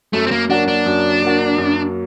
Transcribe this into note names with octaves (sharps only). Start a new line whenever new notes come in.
F#2 A3
C4
A#3
F#3 A#3 D4 F#4
D4
F#2
F#3 A#3 F#4
F#2